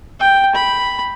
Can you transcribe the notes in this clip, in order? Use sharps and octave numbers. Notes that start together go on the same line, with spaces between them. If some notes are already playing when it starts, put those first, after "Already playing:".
G5
B5